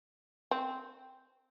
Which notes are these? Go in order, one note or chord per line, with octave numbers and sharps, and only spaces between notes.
C4